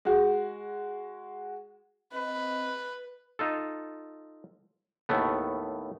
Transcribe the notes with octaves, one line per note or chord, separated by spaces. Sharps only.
G#3 F#4
C4 B4 D#5
D#4 F4 A4
D#2 A2 A3 B3